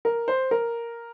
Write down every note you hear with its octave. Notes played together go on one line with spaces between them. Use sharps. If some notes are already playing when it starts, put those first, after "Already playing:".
A#4
C5
A#4